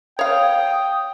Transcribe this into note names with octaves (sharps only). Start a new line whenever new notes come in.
C#5 F5 G5 D#6